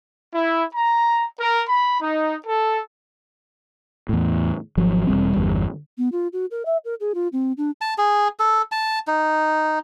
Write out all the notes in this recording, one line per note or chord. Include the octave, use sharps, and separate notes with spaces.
E4
A#5
A#4
B5
D#4
A4
E2 A2
G#1 F3 F#3
E1 G#2 G3 C4
G1 E2 G3
B3
F4
F#4
A#4
E5
A#4
G#4
F4
C4
D4
A5
G#4
A4
A5
D#4